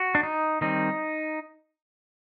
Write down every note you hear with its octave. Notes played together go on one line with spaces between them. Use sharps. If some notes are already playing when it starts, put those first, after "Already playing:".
Already playing: F#4
D4
D#4
D#3 G3 C4 D#4